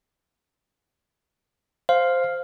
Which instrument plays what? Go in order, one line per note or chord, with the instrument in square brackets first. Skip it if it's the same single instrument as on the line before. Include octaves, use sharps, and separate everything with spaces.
[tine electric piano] C5 [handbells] F5